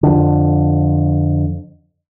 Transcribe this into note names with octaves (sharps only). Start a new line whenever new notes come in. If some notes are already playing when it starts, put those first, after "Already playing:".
F2 D3